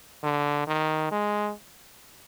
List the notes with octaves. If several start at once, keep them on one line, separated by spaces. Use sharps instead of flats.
D3
D#3
G#3